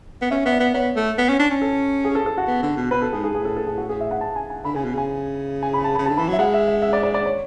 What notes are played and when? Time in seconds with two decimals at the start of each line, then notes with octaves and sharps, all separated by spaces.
0.22 B3
0.31 C#4 E5
0.45 B3 E5
0.52 D5
0.60 B3
0.74 B3 C#5
0.96 A3
1.18 B3
1.29 C#4
1.39 D4
1.50 C#4
1.62 A4
2.05 G#4
2.15 A4
2.26 A4
2.38 F#4
2.48 B3
2.63 D3
2.77 B2
2.91 B2 B4
3.02 A4
3.13 G#2 G#4
3.24 G#4
3.35 A2 G#4
3.45 A4
3.56 A4
3.67 G#4
3.77 F#4
3.89 G#4
4.00 E5
4.11 F#5
4.21 A5
4.36 G#5
4.50 G#5
4.64 D3 B5
4.75 C#3 G#5
4.85 B2
4.94 C#3 G#5
5.63 G#5
5.73 B5
5.84 A5
5.95 B5
5.98 C#3
6.06 A5
6.09 D3
6.17 E3 B5
6.28 F#3 E5
6.39 G#3 F#5
6.54 E5
6.68 E5
6.82 E5
6.93 D5
7.03 D5
7.14 D5
7.26 C#5